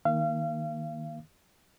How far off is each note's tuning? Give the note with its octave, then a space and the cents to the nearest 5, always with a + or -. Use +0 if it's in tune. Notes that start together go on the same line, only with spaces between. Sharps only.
D#3 +5 A#3 +0 F5 -35